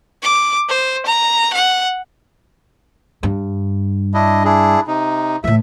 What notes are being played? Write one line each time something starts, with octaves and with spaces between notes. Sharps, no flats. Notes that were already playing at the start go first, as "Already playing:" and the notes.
D6
C5
A#5
F#5
G2
D4 E4 D#5
D4 E4 G#4
C3 D#4
A2 E3 E5